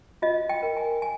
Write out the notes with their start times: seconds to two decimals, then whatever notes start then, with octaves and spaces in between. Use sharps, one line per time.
0.22 F4 D#5
0.49 G5
0.62 A#4
0.77 G#5
1.02 G#5